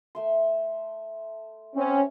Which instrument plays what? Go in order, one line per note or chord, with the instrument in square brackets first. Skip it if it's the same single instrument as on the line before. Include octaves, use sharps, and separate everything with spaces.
[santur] A3 E5 C6
[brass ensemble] C4 C#4